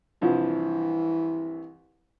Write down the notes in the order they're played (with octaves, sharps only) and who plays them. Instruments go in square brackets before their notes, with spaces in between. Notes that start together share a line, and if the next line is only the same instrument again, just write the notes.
[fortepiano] C2 G2 F3 [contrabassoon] E3